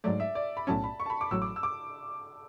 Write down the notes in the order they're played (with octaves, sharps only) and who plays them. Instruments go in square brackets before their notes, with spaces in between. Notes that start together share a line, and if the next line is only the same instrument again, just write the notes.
[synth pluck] G#2 F#3 A3 [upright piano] D5
[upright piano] E5
D5
B5
[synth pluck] B1 A2 F#3 C#4 [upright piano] A5
[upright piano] B5
C#6
A5
B5
D6
[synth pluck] A1 A2 F#3 [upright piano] E6
[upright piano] D6
E6
D6